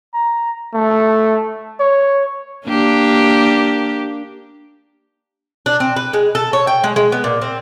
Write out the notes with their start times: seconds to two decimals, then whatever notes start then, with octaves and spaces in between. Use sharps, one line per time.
0.14 A#5
0.74 A3
1.80 C#5
2.66 A#3 D4 G4
5.66 D4
5.80 C4
5.96 B4
6.13 G#3
6.35 A4
6.53 C#5
6.67 G5
6.84 G#3
6.96 G#3
7.12 B3
7.24 A#2
7.41 C4